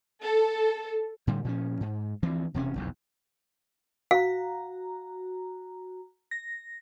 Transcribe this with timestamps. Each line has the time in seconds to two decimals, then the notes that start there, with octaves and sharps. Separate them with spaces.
0.23 A4
1.27 A2 D3 G3
1.44 A#2 F3 C#4
1.81 G#2
2.23 D2 E3 F3 C4
2.54 E1 C3 B3 C#4
2.75 F1 B1 E2
4.11 F#4 F5 A#5
6.31 A#6